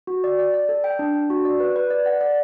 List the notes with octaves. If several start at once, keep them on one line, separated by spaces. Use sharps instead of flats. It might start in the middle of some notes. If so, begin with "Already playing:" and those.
F#4
D5
D5
D5
A4
G5
D4
D4
F#4
D5
B4
B4
D5
F#5
D5